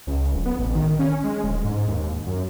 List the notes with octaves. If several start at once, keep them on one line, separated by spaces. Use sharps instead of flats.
C#2
D1
B3
A1
D#3
C#4
G#3
D1
G#2
D#2
F#2